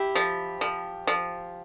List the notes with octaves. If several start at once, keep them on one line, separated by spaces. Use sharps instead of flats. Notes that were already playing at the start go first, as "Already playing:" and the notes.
Already playing: E4 G4
F3
F3
F3